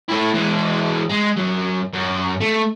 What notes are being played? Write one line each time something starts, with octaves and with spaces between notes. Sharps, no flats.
A3 E4
E3 G#3
G#3
F#2 F#3
F#2
A3